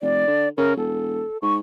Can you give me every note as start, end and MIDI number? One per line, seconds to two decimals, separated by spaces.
0.02 0.23 29
0.02 0.49 74
0.27 0.48 50
0.57 0.75 49
0.57 0.74 70
0.77 1.21 28
0.77 1.38 69
1.42 1.59 44
1.42 1.54 85